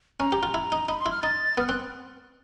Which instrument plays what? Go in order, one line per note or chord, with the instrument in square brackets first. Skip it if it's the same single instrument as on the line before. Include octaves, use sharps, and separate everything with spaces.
[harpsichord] C#4 [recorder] A#5
[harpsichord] G4
F4
E4
D#4
[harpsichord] D#4 [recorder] B5
[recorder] C6
[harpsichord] E4
[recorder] F6
[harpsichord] D#4 [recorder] A6
[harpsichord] B3 [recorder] F6
[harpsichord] C4 [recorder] F#6